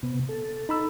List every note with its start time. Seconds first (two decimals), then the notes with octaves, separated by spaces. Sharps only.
0.03 C3 B3
0.29 A4
0.69 D#4 B5 E6